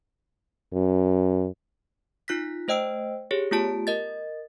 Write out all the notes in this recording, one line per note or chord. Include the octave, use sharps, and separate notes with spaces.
F#2
D#4 F4 F#6 A#6 B6
A3 C5 D#5 G5 E6 D7
G4 G#4 C#5
A3 B3 F4 G4 A5 D7
A#4 D#5 A6